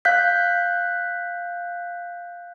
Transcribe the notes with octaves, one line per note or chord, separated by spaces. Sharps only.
F5 F#6 G6 B6